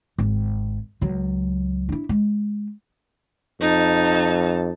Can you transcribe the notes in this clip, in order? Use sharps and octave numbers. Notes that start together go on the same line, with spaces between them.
G#1
C#2 F#3
D4 E4
G#3
F2 D#4 A5